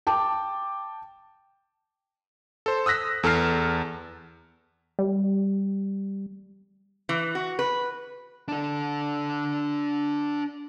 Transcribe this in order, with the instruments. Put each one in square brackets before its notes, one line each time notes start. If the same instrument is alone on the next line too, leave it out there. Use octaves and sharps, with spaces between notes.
[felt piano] G5 A5 D6
[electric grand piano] A4 C5
D#6 E6 F#6 A#6 B6
E2 A4 A5 F6 C7
[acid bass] G3
[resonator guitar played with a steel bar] E3
F#4
B4
[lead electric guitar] D4 A4